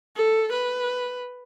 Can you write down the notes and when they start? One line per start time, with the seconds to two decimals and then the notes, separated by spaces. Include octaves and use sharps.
0.16 A4
0.52 B4